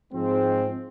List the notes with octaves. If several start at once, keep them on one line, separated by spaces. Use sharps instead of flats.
G#2 F3 G#3 C4